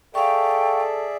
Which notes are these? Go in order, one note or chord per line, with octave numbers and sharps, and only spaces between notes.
G#4 A4 D5 E5 F5 G5 C#6